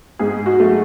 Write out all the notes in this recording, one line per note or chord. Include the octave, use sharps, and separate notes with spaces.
G#2 G#4
F#4
F#3 A3